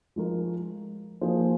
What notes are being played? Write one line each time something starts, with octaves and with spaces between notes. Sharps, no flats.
F3 G#3 F4 A#4
F3 A#3 F4 G#4 C5